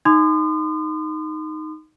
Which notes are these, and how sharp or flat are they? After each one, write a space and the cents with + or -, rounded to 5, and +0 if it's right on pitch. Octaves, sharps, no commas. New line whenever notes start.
D#4 +0 C6 -35 D#6 -40